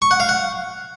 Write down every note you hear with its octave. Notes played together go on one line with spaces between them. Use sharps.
C#6
F#5
F5
F#5